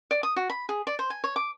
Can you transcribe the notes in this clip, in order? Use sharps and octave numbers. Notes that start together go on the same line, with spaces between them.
D5
D#6
F#4
B5
G#4
D5
C5
G#5
C#5
D6